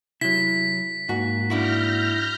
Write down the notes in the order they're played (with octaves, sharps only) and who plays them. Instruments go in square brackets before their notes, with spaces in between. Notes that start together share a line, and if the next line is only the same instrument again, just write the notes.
[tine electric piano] C3 F#3 [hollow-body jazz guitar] E4 [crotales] B6
[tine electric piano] G#2 A#3 [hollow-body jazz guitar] F#4
[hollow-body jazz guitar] D4 E4 F#4 [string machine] F6 G6 A#6